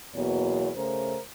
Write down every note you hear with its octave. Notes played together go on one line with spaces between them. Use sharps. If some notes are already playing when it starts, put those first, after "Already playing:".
E2 B2 F#3 A#3 C#5
C#3 A3 A#4 C5